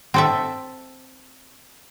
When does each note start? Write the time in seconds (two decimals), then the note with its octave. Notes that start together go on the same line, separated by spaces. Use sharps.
0.14 C4 A4 E5